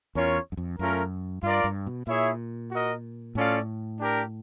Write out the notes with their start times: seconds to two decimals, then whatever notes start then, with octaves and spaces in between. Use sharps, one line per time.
0.15 E2 C#4 F4 A#4 C#5
0.52 F#2
0.57 F2
0.79 F#2 A3 C#4 F4 A#4
1.43 G2 F4 A#4 D5
1.64 G2
1.87 B2
2.07 A#2 E4 G#4 C#5 E5
2.71 F#4 A#4 D#5
3.35 A2 C#4 F4 A4 D5 F5
4.00 D4 G4 A#4